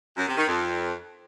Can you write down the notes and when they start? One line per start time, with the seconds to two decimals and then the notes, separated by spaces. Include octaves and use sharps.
0.17 F#2
0.27 C3
0.37 D#3
0.47 F2